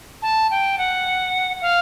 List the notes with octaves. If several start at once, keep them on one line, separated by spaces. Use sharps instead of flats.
A5
G5
F#5
F5